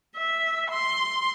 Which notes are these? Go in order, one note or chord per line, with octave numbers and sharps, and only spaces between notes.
E5
C6